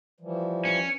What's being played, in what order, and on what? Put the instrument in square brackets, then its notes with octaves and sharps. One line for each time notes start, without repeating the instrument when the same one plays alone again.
[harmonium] E3 F3 G3
[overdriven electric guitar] C#4